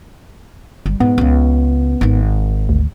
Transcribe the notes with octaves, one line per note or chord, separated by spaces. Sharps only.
G1 G3
G#2 B3
C#2 C#3
G#1 D#3
D2